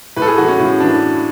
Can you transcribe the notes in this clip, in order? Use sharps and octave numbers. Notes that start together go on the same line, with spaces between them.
A2 B4
A4
G#4
E3 F#4
C#4
A2
E3 D4